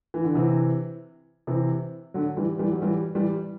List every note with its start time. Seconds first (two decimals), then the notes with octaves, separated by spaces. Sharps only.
0.14 E3
0.24 D3
0.35 C3 E3
1.47 C3 E3
2.14 D3 F#3
2.37 E3 G3
2.59 E3 G3
2.71 F#3
2.82 E3 G3
3.15 E3 G3